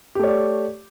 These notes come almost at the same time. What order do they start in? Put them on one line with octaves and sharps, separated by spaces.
G4 A3 C#5 D5